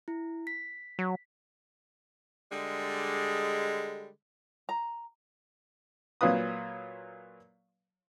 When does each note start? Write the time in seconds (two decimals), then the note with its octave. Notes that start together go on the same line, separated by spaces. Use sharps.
0.08 E4
0.47 B6
0.99 F#3
2.51 D3 G3 G#3
4.69 A#5
6.21 A#2 F#3 F4 B4 D#6